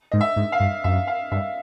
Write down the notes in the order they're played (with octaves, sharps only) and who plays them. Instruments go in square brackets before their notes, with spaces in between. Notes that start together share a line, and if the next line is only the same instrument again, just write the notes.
[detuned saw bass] G#2 [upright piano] D#5
[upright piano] E5
[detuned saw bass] G#2
[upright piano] F5
[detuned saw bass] G2
[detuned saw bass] F#2 [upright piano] E5
[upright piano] F5
[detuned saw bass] G2 [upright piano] E5